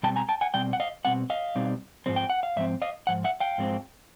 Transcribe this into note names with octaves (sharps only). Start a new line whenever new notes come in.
B2 G3 C4 G5 A5
G#5 A#5
G5 A5
F#5 G#5
B2 G3 C4 G5
F#5
D#5 F5
B2 G3 C4 F#5
D#5 F5
B2 G3 C4 D#4
G#2 F3 G#3 C4
G5
F#5
F5
G#2 F3 C4 E5
D#5 F5
G#2 F3 F#5
E5 F#5
F5 G5
G#2 F3 G#3 C4